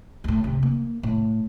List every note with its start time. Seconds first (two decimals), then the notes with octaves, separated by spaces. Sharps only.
0.24 D2 A2
0.44 C3
0.63 A#3
1.03 A2